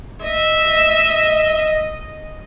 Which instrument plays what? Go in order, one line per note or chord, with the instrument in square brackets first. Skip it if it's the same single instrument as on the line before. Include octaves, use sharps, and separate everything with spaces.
[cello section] D#5 [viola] E5